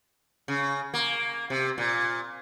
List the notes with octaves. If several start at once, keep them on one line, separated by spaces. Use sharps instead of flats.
C#3
A#3
C3
A#2